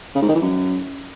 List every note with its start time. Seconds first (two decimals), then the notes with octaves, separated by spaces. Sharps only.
0.15 C#3
0.22 G#2
0.29 D#3
0.35 E3
0.42 F#2